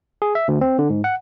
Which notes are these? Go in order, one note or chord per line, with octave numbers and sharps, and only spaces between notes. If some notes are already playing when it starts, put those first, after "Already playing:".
G#4
E5
D2
C4
D3
G#2
F#5